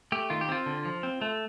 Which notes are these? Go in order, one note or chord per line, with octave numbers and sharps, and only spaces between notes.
A3 G4
D#3 F4
G4
C4 F4
D3
F3
C4
A3